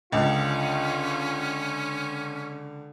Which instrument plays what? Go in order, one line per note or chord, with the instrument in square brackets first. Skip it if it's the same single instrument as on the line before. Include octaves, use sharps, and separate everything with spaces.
[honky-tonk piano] C#2 [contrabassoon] D3 [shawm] C#4 [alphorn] F4